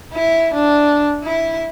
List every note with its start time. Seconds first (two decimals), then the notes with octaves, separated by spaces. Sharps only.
0.13 E4
0.53 D4
1.23 E4